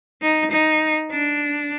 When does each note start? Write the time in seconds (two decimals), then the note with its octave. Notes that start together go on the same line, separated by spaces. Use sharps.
0.22 D#4
0.51 D#4
1.11 D4